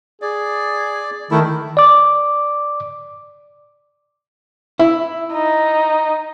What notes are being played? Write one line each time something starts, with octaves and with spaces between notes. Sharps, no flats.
G#4 D5
D#3 A3 E4
D5 D6
E4
D#4